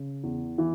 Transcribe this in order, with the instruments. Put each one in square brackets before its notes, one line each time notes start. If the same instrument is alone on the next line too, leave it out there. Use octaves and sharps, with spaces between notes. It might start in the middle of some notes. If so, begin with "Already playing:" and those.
Already playing: [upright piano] C#3
E2
E3